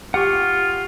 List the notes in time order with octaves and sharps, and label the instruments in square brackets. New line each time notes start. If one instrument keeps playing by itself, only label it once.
[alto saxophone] F4 [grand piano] G4 [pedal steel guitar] F#5 C#6